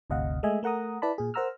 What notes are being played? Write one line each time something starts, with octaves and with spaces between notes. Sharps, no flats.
G1 D2 C3 D#5 F5 F#5
G#3 A3 D#5 E5 G#5
A3 A#4 F#5 A#5 D#6
E4 B4 D5 A5 B5
A#2 G#4
A#4 C5 F#5 A#5 E6 F6